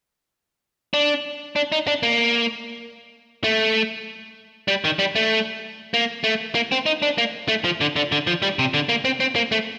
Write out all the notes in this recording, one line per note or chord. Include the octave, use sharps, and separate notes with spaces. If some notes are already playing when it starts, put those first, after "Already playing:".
D4
D4
D#4
D4
A#3
A3
G3
D#3
G3
A3
A#3
A3
A#3
C4
D#4
D4
A#3
A3
F3
D3
D3
D3
F3
G3
C3
D3
A#3
C4
C4
A#3
A3